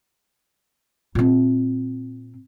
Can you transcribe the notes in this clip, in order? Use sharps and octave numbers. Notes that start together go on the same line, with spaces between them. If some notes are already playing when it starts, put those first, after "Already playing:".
A#2 C4